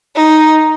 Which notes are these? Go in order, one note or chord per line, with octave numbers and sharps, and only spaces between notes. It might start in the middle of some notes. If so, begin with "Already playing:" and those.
D#4